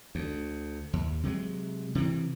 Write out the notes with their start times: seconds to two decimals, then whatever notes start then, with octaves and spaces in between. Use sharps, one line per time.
0.15 D2
0.93 D#2
1.23 C3 F#3 G#3
1.95 C3 E3